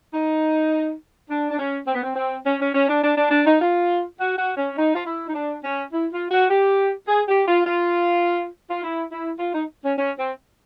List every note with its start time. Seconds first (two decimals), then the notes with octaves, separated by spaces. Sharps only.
0.13 D#4
1.29 D4
1.51 D4
1.58 C#4
1.87 C4
1.94 B3
2.03 C4
2.16 C4
2.45 C#4
2.60 C#4
2.74 C#4
2.88 D4
3.02 D4
3.17 D4
3.31 D4
3.47 D#4
3.61 F4
4.19 F#4
4.38 F#4
4.57 C#4
4.77 D#4
4.94 F4
5.05 E4
5.28 D#4
5.34 D4
5.63 C#4
5.92 E4
6.12 F4
6.31 F#4
6.50 G4
7.08 G#4
7.28 G4
7.47 F4
7.65 F4
8.69 F4
8.83 E4
9.11 E4
9.39 F4
9.54 D#4
9.84 C#4
9.97 C#4
10.18 C4